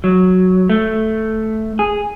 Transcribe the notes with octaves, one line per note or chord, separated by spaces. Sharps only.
F#3
A3
G#4